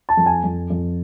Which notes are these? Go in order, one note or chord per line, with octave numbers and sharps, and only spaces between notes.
A5
F2
G#5
F2
F2